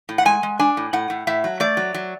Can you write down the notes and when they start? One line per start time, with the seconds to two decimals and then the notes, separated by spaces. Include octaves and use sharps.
0.09 A2
0.18 F#5
0.25 G#3 G#5
0.43 G#3
0.59 D4 G#5
0.77 A2
0.93 A2 F#5
1.10 A2
1.27 A2 E5
1.44 F#3
1.60 A3 D5
1.77 F#3
1.94 F#3